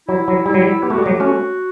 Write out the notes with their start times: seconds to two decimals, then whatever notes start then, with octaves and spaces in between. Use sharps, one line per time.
0.08 F#3 E4
0.28 F#3
0.46 G3 E4
0.54 F#3
0.62 G3
0.83 B3 G4
0.90 A3
0.93 F#4
0.98 G3
1.03 F#3 A3 G4
1.20 A3 C#4 F#4